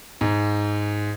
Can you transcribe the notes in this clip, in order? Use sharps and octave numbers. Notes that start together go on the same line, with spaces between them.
G#2